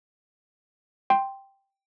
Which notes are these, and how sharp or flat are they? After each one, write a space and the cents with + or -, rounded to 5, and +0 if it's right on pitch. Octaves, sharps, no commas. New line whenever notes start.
G5 +0 C6 +0